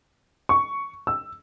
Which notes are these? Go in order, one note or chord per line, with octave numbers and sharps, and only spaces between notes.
C#6
E6